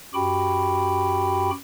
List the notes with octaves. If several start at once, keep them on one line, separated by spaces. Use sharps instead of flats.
F#2 F#4 G4 G5 B5